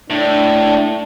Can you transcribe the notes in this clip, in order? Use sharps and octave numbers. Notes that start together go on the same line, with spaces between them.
A2 D4